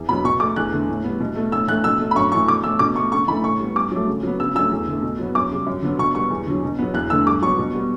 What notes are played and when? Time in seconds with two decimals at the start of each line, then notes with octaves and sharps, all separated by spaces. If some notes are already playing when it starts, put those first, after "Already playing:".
Already playing: E2
0.09 B2 F#3 B3 B5
0.24 B2 C#6
0.40 A3 D6
0.56 E2 F#6
0.72 D3 A3
0.89 A2
1.04 G3 B3
1.20 B2
1.36 A3
1.52 A2 E6
1.68 E3 A3 F#6
1.84 B2 E6
2.00 A3
2.11 B5
2.16 F#2 C#6
2.32 E3 A3 C#6
2.48 B2 D6
2.64 A3 E6
2.79 B2 D6
2.95 A3 C#6
3.12 C#3 C#6
3.27 E3 B5
3.31 A3
3.43 A2 C#6
3.60 G3 B3
3.76 G2 D6
3.91 F#3 A3
4.07 C#3
4.23 F#3 B3
4.40 C#3 E6
4.55 F#3 A3 E6
4.71 E2
4.88 D3 A3
5.02 B2
5.18 F#3 B3
5.35 F#2 D6
5.52 C#3 G3
5.66 F#2
5.82 D3 F#3 B3
5.98 B2 C#6
6.15 G3 B3 C#6
6.30 E2
6.47 D3 F#3
6.63 B2
6.79 F#3 B3
6.94 E2 F#6
7.10 D3 A3 E6
7.26 G2 D6
7.42 F#3 B3 C#6
7.58 B2
7.74 G3 B3